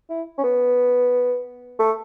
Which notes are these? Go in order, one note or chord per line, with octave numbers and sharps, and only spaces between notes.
E4
C#4
B3
A3